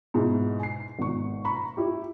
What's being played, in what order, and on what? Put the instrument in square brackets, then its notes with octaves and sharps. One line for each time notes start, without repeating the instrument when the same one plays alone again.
[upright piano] G#2 B2 E4
G#5 C7
G#1 B2 C#6
A#5 B5 C#6
E4 G4